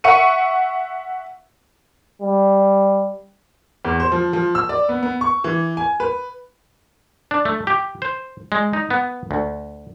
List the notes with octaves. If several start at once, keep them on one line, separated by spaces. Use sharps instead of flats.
E5 F#5 C#6 C#7 D#7
G3
E2
C5
F3
F3
E6
D5
B3
B3
C#6
E3
G#5
B4
D4
A3
G4
C5
G#3
D#4
B3
D2